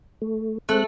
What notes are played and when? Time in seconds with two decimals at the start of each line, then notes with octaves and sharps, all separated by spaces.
0.22 A3
0.69 G#3 A3 C4 F#6